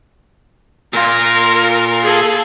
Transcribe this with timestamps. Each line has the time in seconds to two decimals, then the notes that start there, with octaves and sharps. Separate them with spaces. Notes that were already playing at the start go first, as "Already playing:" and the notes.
0.93 A#2 F4 A#4
2.02 G#4 A4